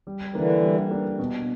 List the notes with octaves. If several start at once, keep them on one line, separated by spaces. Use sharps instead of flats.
G3
D3 E3 A#3 D4
G3
A#3 D4
B2